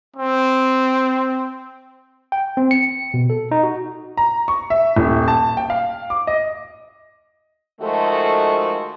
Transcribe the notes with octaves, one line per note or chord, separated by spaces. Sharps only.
C4
G5
C4
C#7
B2
A4
D#4
F#4
A#5
C#6
E5
D#1
A5
G5
F5
D6
D#5
D#3 F3 G#3 A3 F#4 A4